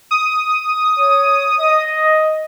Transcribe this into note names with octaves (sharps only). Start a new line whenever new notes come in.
D#6
C#5
D#5